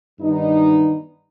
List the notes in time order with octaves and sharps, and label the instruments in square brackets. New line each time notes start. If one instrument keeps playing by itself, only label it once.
[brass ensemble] G2 D#3 E3 B3 D4 D#4